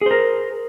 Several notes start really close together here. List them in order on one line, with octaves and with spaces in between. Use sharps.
G#4 C5 A#4